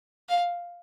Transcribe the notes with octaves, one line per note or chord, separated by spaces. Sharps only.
F5